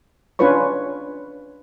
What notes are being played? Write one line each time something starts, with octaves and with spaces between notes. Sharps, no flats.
C#4 D4 F4 B4 C#5 C#6